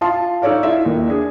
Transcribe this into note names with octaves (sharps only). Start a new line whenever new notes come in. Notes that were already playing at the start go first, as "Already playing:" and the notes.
F4 F5 A5 C6
D#4 A4 C#5 D5 F5
E4 F4 E5
D#2
D4 G#4